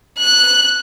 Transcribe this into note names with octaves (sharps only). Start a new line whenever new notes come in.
F#6